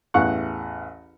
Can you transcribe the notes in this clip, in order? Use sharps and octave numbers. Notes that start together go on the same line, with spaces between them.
A1 E2 F5 F#5 C#6 F#6